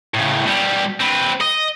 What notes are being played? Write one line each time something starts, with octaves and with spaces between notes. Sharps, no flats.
A2 C#3
B2 G3
C4 B4
D#5